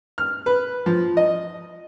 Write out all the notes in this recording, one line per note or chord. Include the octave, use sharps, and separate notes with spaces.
F6
B4
F3
D#5